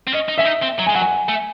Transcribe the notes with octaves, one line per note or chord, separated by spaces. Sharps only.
C4
C#4 D#5
D#4
C#4 E5
D#4
C4
F#3
G#5
G#3
F#3 F#5
G#5
A3